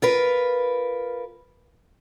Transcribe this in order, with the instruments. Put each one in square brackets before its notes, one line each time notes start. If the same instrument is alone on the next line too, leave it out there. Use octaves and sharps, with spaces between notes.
[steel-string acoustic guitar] F4 A#4 B4